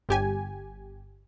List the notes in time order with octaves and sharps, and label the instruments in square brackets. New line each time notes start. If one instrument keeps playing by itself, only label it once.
[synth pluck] G1 G4 G#5